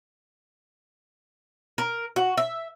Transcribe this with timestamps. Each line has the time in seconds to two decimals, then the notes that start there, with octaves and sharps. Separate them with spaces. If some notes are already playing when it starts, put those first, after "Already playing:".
1.78 A#4
2.16 F#4
2.37 E5